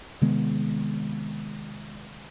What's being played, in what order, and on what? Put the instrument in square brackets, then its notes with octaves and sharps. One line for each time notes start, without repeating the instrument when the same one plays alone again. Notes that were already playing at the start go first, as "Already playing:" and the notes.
[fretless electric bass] C3 D#3 G#3 B3